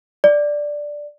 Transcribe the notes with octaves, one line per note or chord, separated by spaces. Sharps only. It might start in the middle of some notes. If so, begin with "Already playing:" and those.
D5